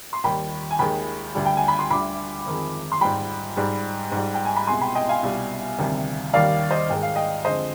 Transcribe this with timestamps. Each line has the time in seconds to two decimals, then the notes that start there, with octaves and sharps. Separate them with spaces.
0.13 C6
0.24 D#2 D#3 G3 G5 B5
0.71 G#5
0.79 D#2 D#3 G#3 G5 B5
1.35 D2 D3 G3
1.46 G5
1.57 G#5
1.68 B5
1.79 C6
1.90 D2 D3 G3 B5 D6
2.46 F2 D#3 G#3
2.92 C6
3.01 G#2 G3 G5 B5
3.57 G#2 G3
4.12 G#2 G3
4.34 G5
4.45 G#5
4.56 B5
4.67 C2 B2 G#3 G#5 C6
4.81 G5 B5
4.95 D#5 G5
5.09 F5 G#5
5.23 C2 B2 G3
5.78 D2 C3 D#3 G3
6.34 D#2 D#3 G3 D5 F5
6.71 C5 D#5
6.89 G#2 D#3 G#3 G5
7.03 F5
7.16 D#5 G5
7.45 F2 D3 G#3 C5 D#5